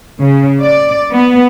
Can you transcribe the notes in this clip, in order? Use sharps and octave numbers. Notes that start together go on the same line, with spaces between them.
C#3
D5
B3